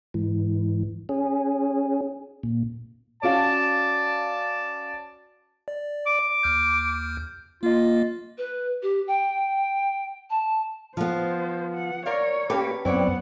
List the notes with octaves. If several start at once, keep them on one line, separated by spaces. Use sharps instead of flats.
G#2 E3
C#4 G#4
A#2
C#4 F#4 D5 F5 A5
D5
D6
D#2 F6 G6
A#3 F4 D#5
B4
G4
G5
A5
F3 B3 C5
F#5
A#4 C#5 D5 F5
A3 A#3 C#4 G4 B4
F#2 B3 C4 E4 C#5 D5 F#5